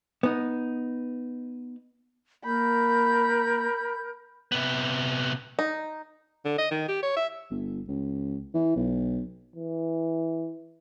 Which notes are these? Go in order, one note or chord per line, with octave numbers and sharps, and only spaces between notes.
B3 D#4
A#3 A#4 B5 G6
C3 B3
D#4
D3
D#5
D#3
G4
C#5
E5
G1
C#2
E3
B1
E3